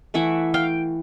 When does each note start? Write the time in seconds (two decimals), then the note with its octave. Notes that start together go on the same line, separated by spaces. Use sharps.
0.14 E3 A3 E5 F#5
0.54 F5 G5